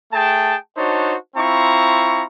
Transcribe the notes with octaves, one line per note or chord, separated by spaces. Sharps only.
A3 G#4 G5 A5
D4 D#4 F#4 C5 C#5 A5
C4 E4 F4 A#5 C#6